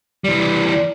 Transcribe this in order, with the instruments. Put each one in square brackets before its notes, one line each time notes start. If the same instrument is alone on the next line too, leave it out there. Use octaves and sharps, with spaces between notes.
[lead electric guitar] E3 G3 [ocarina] D5